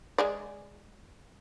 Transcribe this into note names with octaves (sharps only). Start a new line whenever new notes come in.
G#3 G#4 D5